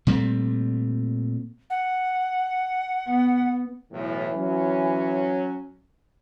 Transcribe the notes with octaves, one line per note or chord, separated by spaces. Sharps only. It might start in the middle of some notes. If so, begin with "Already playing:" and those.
A#2 G3 A3 C4
F#5
B3
B1 E2 A2 E3
F#3 C#4